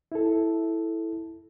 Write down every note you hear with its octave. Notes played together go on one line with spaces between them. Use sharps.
E4 A4